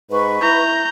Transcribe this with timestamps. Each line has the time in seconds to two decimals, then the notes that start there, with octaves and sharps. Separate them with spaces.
0.11 G#2 B4 C#6
0.42 E4 A#5 G6